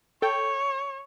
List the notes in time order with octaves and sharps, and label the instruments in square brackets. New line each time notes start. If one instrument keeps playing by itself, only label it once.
[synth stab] A4 G5 [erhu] C#5